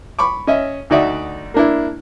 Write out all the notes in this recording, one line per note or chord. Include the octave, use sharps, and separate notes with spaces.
B5 C#6 D6
C#4 D#5 E5
D2 D#4 F#4 D5 E5 D#6
A#3 D4 E4